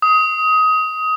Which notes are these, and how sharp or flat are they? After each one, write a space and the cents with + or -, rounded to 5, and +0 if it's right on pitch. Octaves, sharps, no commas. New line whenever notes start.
D#6 +20